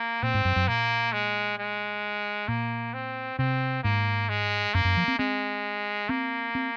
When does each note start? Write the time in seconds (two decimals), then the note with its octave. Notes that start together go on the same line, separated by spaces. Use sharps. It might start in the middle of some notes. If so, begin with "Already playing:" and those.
Already playing: A#3
0.23 A#2 C4
0.34 G#2
0.45 F#2
0.56 F#2
0.68 A#2 A#3
1.13 G#3
1.58 G#3
2.48 A#2 A#3
2.94 C4
3.38 C3 C4
3.83 G#2 A#3
4.29 G#3
4.74 F#2 A#3
4.85 F#2
4.97 F3
5.08 C4
5.19 G#3 C4
6.09 A#3 C4
6.55 C4